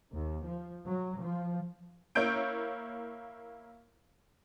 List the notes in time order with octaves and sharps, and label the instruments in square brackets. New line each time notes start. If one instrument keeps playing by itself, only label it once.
[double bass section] D#2
F3
F#3
F3
[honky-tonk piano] A#3 E4 C#5 G6 D7